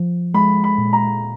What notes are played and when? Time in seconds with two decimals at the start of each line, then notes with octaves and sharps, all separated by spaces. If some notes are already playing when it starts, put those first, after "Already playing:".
Already playing: F3
0.34 G#3 B5
0.64 B5
0.78 A#2
0.93 A#5